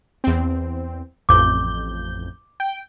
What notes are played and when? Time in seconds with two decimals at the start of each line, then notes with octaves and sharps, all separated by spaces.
0.24 E2 C4
1.29 A1 F2 D6 G6
2.60 G5